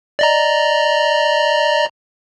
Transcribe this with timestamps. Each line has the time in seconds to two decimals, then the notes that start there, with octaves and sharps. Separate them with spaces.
0.19 D5 D#5 A#5